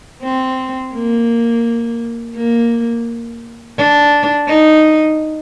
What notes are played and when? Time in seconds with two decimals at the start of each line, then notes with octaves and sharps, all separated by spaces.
0.23 C4
0.94 A#3
2.35 A#3
3.78 D4
4.47 D#4